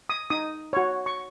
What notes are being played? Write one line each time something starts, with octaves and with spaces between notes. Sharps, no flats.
D#6
D#4 D#6
F#4 C#5
C#6